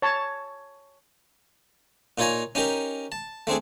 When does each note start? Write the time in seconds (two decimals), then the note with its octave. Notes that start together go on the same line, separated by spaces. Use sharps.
0.02 C#5 A5
2.18 A#2 D#4 F4 C#5 G#5 A#5
2.55 C#4 D#4 G4 A#4
3.12 A5
3.47 A3 C4 D4 G#4